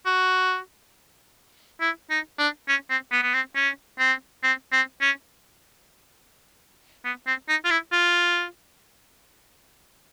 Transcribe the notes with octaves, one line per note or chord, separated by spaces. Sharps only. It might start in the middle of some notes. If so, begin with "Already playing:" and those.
F#4
E4
D#4
D4
C#4
C4
B3
B3
C4
C#4
C4
C4
C4
C#4
B3
C4
D#4
F4
E4
F4